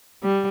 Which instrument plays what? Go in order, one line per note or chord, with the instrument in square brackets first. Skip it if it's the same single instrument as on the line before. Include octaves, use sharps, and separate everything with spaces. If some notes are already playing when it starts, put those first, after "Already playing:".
[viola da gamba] G3